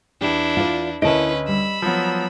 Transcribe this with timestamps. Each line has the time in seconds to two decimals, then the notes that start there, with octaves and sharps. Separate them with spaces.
0.21 E2 D4 E4 G4
0.57 F4 D5
1.02 D2 C#4 E4 A#4 B4 D#5 A5 D7
1.48 G3 B5 E6
1.82 F3 F#3 B3